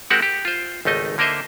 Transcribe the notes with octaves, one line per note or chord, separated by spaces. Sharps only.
G#3 C4 F#4 G4 A#4 F#5
G4
F4 C5
G#1 C#2 A3 D#4 D#5
D3 A#3 A#4 C5 D#5 E5